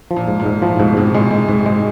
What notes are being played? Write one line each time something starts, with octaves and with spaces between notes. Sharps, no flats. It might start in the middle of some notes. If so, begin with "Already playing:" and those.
F3
A#2
G#2
A#2
G#2
A2 F3
G#2 B2
G#2 C3
A#2 G#3
G#3
G#2
G#3